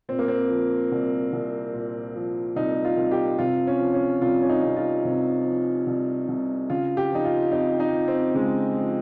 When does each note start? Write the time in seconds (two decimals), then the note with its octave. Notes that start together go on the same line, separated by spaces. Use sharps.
0.09 A#2 C4
0.19 A#3
0.28 C4
0.50 F3
0.92 C2
1.33 C2
1.73 A#2
2.15 F3
2.56 C2 D#4
2.85 F4
2.97 C2
3.11 G4
3.39 C3 F4
3.67 C#4
3.80 F3
3.94 C#4
4.22 C2 F4
4.42 C#4
4.49 D#4
4.63 C2
4.76 F4
5.05 C3
5.46 F3
5.87 C2
6.28 C2
6.70 C#3 F4
6.97 G4
7.11 F3 D#4
7.25 F4
7.52 F2 D#4
7.80 D#4
7.94 F2
8.08 C4
8.35 C#3 G#3
8.76 F3